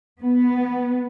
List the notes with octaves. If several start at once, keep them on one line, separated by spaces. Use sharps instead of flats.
B3